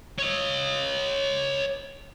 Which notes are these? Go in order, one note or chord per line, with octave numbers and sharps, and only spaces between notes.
C#5 D#5